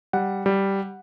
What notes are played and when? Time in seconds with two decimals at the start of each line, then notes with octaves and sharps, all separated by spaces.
0.13 G3 F#5
0.46 G3